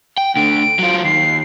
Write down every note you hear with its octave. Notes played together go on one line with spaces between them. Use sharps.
G5
D2 D3 D7
F#3 F4
D#2 C7